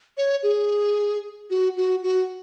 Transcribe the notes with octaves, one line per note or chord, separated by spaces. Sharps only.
C#5
G#4
F#4
F#4
F#4